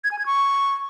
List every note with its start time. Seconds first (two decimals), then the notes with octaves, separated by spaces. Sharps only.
0.04 G#6
0.11 G#5
0.19 G#6
0.26 C#6